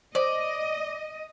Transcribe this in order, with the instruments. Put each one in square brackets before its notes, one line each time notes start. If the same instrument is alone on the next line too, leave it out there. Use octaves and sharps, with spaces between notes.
[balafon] C5 [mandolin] D5 [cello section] D#5